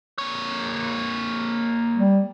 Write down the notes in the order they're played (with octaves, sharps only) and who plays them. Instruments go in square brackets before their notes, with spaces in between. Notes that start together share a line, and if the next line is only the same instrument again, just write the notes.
[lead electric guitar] A#3 C#5
[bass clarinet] G3